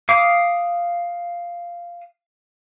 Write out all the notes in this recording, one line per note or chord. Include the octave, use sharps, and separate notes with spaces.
F5 D6 D#6